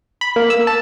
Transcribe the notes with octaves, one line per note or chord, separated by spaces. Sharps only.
B5
A#3
E6
A5